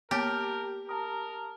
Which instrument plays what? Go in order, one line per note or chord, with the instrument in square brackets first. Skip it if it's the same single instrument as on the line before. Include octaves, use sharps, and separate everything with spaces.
[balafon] A#3 B3 C#5 [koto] G4 [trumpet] A#4 [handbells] A5 F6
[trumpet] A#4 [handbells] A5 A#5 D#6